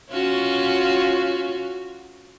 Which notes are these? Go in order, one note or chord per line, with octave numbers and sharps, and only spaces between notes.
C#4 F4 F#4